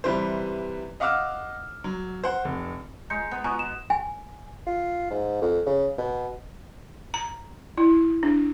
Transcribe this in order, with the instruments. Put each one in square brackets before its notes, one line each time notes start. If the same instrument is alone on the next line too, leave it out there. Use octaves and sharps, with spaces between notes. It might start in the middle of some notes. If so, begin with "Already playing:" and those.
[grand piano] C3 E3 G3 B4 C5
D#5 F5 F#5 D6 E6 F6
F#3
C5 F#5
F1
[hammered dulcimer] G#3 [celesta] A#5 G6 C#7
[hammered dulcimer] B3
[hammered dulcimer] B2 [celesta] G#5 A#5 C#6
[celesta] E7
[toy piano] G#5
[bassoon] F4
G#2
F2
C#3
B2
[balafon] A#5
E4
D4